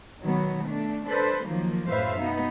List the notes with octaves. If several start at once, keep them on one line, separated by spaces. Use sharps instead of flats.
B2 D#3 F#3 B3
A3 D4
D4 A4 B4 C5
D#3 F3 F#3 A#3
F#2 A2 B4 C5 E5 F5
B2 B3 D#4